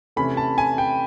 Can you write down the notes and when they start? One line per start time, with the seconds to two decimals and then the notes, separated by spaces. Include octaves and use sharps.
0.16 C3 E3 A3 C#4 B5
0.37 A5
0.58 G#5
0.78 G5